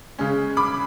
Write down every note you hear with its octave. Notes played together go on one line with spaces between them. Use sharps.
C#3 G#3 C#4
B5 D6